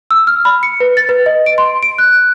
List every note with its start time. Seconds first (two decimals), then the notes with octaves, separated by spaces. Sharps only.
0.11 E6
0.27 F6
0.45 B5
0.63 C#7
0.80 B4
0.97 A6
1.09 B4
1.26 D#5
1.46 D7
1.58 C6
1.83 D7
1.98 F#6